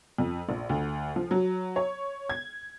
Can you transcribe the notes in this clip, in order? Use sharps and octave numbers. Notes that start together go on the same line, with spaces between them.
F2
A#1
D2
F3
F#3
C#5
G#6